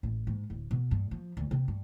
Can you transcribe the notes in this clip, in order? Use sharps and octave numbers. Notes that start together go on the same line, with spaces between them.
A1
G#2
D1
B2
G2
F3
D2
C3
G2